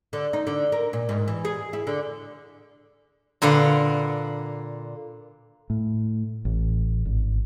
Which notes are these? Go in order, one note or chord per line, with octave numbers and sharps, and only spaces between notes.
D3
D#4
D3
A#4
A#2
G#2
E3
G#4
E4
D3
A#2 D3 B4 F5 F#5
A2
A1
G#1